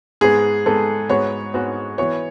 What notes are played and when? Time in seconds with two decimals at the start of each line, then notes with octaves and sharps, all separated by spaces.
0.21 G#2 G#3 B3 G#4
0.66 G#2 G#3 B3 A4
1.09 G#2 G#3 B3 F#4 C#5
1.54 G#2 G#3 B3 F#4
1.98 E3 B3 F#4 C#5